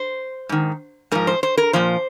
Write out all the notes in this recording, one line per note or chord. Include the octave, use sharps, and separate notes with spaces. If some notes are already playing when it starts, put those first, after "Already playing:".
Already playing: C5
G#2 D#3
G#2 F3 A#4
C5
C5
A#4
A#2 F3 C5